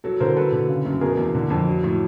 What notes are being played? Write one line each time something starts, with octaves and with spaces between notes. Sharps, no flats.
F#3 A4
D3 A#4 C5
F#3 A4 B4
D3
C#3
F#2
B2 G#4 A#4
E2
D3
F2
F#3
A2